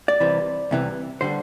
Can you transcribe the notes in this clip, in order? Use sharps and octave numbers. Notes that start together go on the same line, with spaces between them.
D5
C2 C3 E3
C2 C3 E3
D3 G3 C5